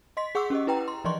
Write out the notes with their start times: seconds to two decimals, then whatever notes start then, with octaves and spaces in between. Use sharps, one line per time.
0.17 D#5 C6 B6
0.35 G#4 F#5 C#6 D6 E6
0.50 C#4 G4 D#5
0.67 E4 B4 G5 A#5
0.88 C6
1.04 E3 F3 D5 D#5 C6 C#6